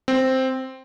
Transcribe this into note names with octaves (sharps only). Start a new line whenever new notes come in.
C4